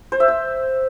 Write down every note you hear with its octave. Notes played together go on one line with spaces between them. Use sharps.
C5
E5
E6